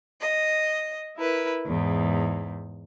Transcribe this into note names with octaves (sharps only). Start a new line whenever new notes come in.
D#5
E4 A#4 B4
E2 G#2